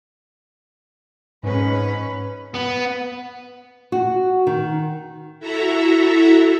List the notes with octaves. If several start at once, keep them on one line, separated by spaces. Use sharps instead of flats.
G#2 C#4 B4
B3
F#4
D#3
E4 F#4 A4 E5 A#5